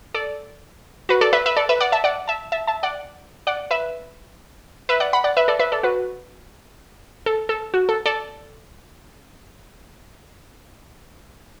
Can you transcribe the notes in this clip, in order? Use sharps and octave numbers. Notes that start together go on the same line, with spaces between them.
A4 D5
F#4 B4
A4 D5
B4 E5
B4 E5
A4 D5
B4 E5
D5 F#5
E5 A5
D5 F#5
E5 A5
E5 A5
E5 A5
D5 F#5
D5 F#5
B4 E5
B4 E5
D5 F#5
F#5 B5
D5 F#5
B4 E5
A4 D5
B4 E5
A4 D5
F#4 B4
A4
A4
F#4
A4
A4 D5